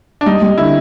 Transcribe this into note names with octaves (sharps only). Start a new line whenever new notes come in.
D4
G3 D#4
G3
D3 E4